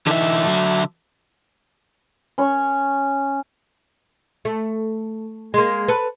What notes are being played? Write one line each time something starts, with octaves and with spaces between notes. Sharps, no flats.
D3 E3 D#4 E5
F#3
C#4 C#6
A3
G#3 A#3
A4 B4